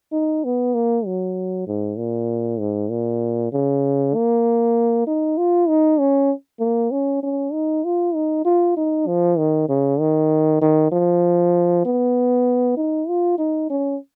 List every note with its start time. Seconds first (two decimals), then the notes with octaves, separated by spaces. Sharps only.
0.12 D#4
0.44 B3
0.74 A#3
1.06 F#3
1.67 G#2
1.98 A#2
2.60 G#2
2.90 A#2
3.52 C#3
4.14 A#3
5.07 D#4
5.38 F4
5.68 D#4
5.99 C#4
6.60 A#3
6.91 C#4
7.23 C#4
7.52 D#4
7.84 F4
8.15 D#4
8.45 F4
8.77 D#4
9.07 F3
9.38 D#3
9.69 C#3
10.00 D#3
10.61 D#3
10.92 F3
11.85 B3
12.77 D#4
13.08 F4
13.39 D#4
13.70 C#4